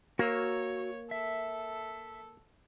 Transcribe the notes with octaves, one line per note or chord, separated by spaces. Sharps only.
A#3 F#4 C#5 E6
A4 E5